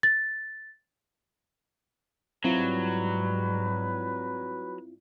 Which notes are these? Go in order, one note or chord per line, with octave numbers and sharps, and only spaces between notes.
A6
G#2 F#3 G3 C4 E4 F4 B4